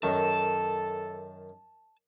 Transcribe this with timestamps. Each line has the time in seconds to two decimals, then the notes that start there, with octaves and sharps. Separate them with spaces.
0.03 F#2 D#3 A4 A5